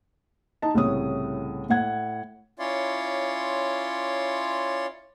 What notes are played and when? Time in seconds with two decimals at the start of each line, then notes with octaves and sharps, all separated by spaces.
0.62 D#4 D#5 A5
0.75 C2 A2 C#3 C#5 D#6
1.70 A2 F#5 G#6
2.59 C#4 E4 F4 C#5 D5 C6